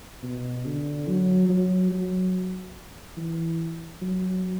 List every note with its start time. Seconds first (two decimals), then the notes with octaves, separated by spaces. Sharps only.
0.23 B2
0.65 D3
1.07 F#3
1.49 F#3
1.92 F#3
3.17 E3
4.02 F#3